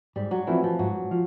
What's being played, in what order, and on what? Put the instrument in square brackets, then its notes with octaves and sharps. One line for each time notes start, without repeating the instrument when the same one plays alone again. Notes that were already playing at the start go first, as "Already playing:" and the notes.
[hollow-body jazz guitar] G#2 [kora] G3
[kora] F#3
[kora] E3 [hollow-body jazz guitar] F3 A3 C4 E4
[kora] F3
[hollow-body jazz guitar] G#2 [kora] F#3
[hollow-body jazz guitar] F3